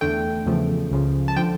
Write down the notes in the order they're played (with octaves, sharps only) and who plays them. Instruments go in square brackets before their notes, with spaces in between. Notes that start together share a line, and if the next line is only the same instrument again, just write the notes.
[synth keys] E2 D3 A3 G5
E2 C#3 F3 A3
C#2 C#3 F3
A5
D3 F3 G5